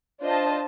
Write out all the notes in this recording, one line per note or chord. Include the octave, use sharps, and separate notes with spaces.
D4 F4 C5 D#5 A5